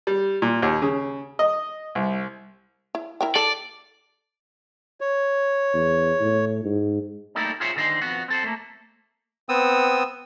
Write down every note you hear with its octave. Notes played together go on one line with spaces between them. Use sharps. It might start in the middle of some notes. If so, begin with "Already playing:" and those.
G3
A#2
D#2
C#3
D#5
C2
E4
E4 A#4 G5
A4 D5
C#5
E2
A2
G#2
G3 A3 A#3 D#4 E4 A4
F4 G#4 C5 C#5 E5
D3 D#3 A4 C5 D#5 C6
F2 B3 F#4
C4 A4 C5
A3 A#3
B3 C4 D#6 E6